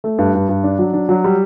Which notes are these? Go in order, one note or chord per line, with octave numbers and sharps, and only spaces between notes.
A3
G2
G2
G2
D4
F#3
D4
F#3
G3